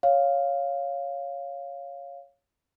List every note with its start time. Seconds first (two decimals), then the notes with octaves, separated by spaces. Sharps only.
0.03 C#5 F5